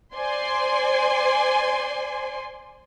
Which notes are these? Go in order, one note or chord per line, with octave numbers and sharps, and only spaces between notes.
C5 D5 G#5 C6